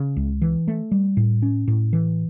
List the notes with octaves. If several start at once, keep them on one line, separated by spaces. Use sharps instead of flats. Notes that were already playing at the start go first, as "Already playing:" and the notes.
Already playing: C#3
C#2
E3
A3
G3
A2
C#4
A2
E3